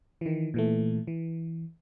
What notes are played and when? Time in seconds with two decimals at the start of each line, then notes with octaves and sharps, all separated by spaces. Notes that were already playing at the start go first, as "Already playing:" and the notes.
0.21 D#3 E3
0.54 A#2 E3 A3
1.07 E3